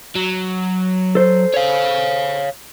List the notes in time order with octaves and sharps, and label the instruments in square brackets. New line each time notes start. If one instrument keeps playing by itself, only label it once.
[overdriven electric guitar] F#3
[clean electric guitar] A4 C5
[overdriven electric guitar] C#5 F5